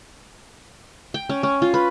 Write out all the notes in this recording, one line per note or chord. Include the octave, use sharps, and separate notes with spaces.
G5
C#4
C#4
F4
B4